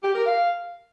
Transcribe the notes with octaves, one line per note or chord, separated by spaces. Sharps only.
G4
A#4
F5